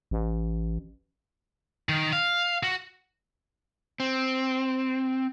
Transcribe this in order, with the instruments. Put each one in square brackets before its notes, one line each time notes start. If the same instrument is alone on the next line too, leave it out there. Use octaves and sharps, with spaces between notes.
[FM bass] A1
[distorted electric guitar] D#3
F5
F#4
[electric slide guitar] C4